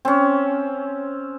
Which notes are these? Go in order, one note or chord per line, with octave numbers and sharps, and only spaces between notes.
C4 C#4